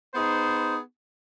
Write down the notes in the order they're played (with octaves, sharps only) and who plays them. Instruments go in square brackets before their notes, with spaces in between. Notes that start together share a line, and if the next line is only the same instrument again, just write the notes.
[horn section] B3 D#4 G#4 C5